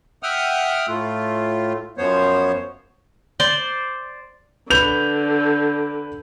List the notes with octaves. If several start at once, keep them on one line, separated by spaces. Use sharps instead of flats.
E5 F#5 G5 D#6 F6
A2 A3 F4
F#2 F3 B3 C5 C#5
C5 D5 C6
D3 B4 G6 F7